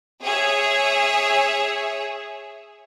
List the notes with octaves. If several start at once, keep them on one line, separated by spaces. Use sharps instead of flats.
G#4 C#5 E5